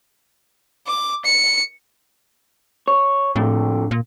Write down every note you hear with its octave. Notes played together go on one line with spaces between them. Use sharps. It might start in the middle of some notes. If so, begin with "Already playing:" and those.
D6
C#7
C#5
F2 A2 D3
A#2